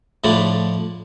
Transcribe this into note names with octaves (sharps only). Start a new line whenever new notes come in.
A2 D3 F3 A3 D4 E4